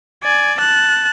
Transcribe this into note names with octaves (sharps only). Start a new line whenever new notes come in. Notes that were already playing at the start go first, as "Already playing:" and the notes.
D5 G#5
A5 F#6